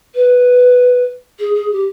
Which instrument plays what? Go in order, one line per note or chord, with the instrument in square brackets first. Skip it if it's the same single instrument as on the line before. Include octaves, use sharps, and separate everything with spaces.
[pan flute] B4
G#4
G#4
G4